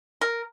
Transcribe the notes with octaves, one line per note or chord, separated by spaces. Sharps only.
A#4